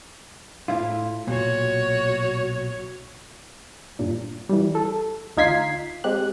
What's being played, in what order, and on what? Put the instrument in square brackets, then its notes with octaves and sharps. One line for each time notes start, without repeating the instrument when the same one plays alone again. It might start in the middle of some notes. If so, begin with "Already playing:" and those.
[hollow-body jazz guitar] A2 E4 F4
[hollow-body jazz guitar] B1 A#2 [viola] F#4 C#5
[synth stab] G2 A#2
E3 G3
A4
D2 D#4 F4 G#6 B6 C7
G#3 C4 G4 F#6